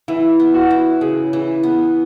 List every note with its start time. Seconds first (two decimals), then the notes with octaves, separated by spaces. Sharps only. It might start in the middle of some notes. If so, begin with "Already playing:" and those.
0.08 E3 E4
0.40 B3
0.54 F#4
0.71 E4
1.01 C#3 G#4
1.33 E3
1.63 B3